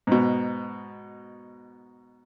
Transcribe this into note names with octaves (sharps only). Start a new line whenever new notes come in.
G#2 B2